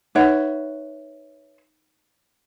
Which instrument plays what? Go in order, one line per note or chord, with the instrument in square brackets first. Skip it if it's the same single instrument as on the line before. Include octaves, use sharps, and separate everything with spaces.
[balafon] D#4 F#5 [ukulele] B4 C#5 E5